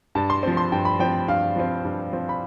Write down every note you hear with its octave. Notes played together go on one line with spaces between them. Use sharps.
G2 A5
C6
F3 C4
C6
G2 G5
B5
F3 C4 G5
G2 F5
F3 C4
G2
F3 C4
B5